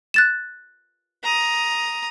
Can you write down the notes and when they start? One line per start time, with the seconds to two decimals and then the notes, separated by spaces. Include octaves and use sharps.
0.14 F#6 A6 E7
1.24 A#5 D#6